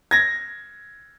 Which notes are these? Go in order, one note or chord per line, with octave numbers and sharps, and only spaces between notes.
G#6 A#6